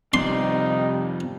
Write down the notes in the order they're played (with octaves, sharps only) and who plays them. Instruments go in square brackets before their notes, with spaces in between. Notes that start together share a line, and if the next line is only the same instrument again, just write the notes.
[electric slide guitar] F2 D5 [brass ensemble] C3 D#3 G3 [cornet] D#4 [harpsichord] C6